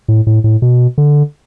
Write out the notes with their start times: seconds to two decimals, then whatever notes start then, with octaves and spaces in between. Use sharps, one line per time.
0.08 A2
0.27 A2
0.44 A2
0.62 B2
0.98 D3